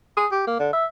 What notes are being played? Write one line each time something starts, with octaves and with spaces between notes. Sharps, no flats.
G#4
G4
A#3
D3
E5